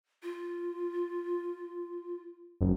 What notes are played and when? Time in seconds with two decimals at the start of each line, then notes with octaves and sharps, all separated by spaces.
0.23 F4
2.61 F#1